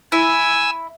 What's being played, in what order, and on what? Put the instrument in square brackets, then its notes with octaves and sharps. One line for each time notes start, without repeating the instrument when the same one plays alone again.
[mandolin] E4 [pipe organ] G#5 E6